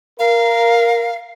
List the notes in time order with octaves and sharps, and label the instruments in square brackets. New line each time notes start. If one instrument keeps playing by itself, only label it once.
[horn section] A#4 [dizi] F5